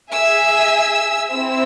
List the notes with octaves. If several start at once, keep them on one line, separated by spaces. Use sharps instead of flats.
G#4 E5 G#5 E6
C4 E4 E6